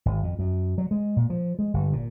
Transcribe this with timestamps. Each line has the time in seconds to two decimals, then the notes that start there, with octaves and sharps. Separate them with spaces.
0.06 G#1
0.23 F2
0.39 F#2
0.78 F#3
0.91 G#3
1.16 A#2
1.30 F3
1.59 G#3
1.74 G1
1.93 A#2